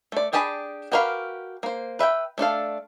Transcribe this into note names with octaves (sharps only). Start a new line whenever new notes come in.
A3 D5
D4 G4 G#4 A5 B5
F#4 G4 A#4 B4 F5
A#3 C5
B4 E5 F#5 G5
A3 D4 A4 F5